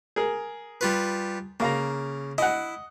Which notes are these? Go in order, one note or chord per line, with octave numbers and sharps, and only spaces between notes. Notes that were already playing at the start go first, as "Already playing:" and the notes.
G#4 A#4
G3 F4 B4
C#3 A#3 F5 A#5
E4 D#5 F#5